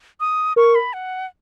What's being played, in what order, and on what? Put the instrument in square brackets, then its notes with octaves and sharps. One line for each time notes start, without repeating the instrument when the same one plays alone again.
[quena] D#6
[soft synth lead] A#4 [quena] C#6
[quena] B5
F#5